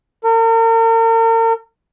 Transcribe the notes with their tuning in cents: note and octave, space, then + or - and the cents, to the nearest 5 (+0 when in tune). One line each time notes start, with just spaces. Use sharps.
A#4 -40